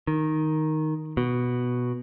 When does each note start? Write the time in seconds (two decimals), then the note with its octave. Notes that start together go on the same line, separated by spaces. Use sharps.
0.07 D#3
1.17 B2